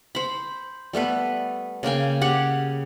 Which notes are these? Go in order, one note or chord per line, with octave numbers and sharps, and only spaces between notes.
C5 B5
G3 A3 B3 B4
C#3 A#3 G5 G#5
G4 G#4 C#5 F#5